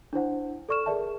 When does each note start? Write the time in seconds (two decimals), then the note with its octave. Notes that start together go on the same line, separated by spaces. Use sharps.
0.13 D4 E4 C5 F#5
0.69 A4 D5 C#6 F6 E7
0.86 G#4 A#4 D5 E5 A5